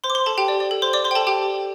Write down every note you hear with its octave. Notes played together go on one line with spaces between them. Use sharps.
C5 C6
D6
C5 C6
A4 A5
G4 G5
D5
D5
A4
C5 C6
D5 D6
C5 C6
G5
A4 A5
G4 G5